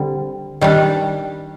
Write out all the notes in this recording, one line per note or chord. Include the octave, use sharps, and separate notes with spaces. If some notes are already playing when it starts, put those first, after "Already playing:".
Already playing: D3 G3 C4
D#3 G3 D4